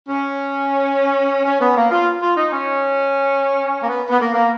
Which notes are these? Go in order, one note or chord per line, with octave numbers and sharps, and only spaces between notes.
C#4
C#4
B3
A#3
F4
F4
D#4
C#4
A#3
B3
B3
A#3
A#3